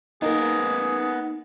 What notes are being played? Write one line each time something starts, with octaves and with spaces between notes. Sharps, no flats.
A#3 B3 D#4 G#4 A#4